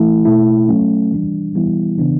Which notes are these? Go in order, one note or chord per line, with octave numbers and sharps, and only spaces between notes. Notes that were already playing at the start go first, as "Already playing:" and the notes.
Already playing: E3 A3 E4
B2 A3 E4
F#3 A3 C#4
E3 G3 D4
E3 G3 B3 E4
C#3 E3 B3 D4